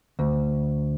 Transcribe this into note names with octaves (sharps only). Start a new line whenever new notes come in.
D2